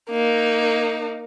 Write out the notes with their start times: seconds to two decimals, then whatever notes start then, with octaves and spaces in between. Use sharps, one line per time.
0.10 A#3 D#4